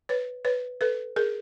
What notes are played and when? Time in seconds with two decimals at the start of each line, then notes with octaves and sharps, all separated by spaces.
0.09 B4 C#5
0.45 B4 C#5
0.81 A4 B4
1.16 G#4 A#4